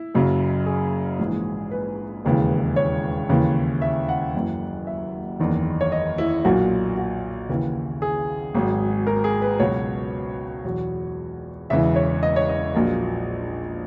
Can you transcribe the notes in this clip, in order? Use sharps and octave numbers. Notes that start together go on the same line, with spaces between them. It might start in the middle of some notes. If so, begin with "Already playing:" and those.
Already playing: E4
F#1 F#2 C#3 F#3
G#4
A#1 G#2 E3
B4
E1 D#2 C#3 E3
C#5
D#2 C#3 E3
E5
F#5
F#1 F#2 E3
E5
F#1 E2 D#3
C#5
D#5
E4
B1 A#2 F#3 F#4
F#4
D#2 C#3 E3
G#4
G#1 G#2 F#3
A#4
G#4
B4
C#2 B2 F#3 C#5
E2 B2 F#3
E1 E2 C#3 E3 E5
C#5
D#5
C#5
D#5
A#1 A#2 F#3